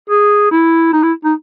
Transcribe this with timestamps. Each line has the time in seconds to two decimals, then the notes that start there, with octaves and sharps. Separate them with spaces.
0.10 G#4
0.51 E4
0.93 D#4
1.03 E4
1.24 D#4